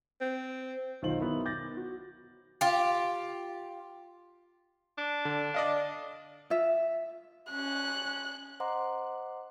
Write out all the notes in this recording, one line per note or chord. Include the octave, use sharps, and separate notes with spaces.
C4
B1 D#3 F4 C5 F#7
D#3 F#3 B3 E4 A#4
D6 G6 A6 A#6
F#4
F4 G4
D4
D3
D5 D#5 F5
F4 E5
C#4 F#6
C5 D#5 F#5 A#5 C6 D6